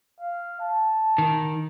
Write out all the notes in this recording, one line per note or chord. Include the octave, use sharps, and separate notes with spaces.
F5
A5
D#3